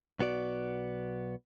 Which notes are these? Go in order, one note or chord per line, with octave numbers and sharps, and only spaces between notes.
B1 B3 F#4 D5